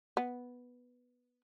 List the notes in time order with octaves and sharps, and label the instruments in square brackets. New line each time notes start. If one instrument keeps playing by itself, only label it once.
[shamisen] B3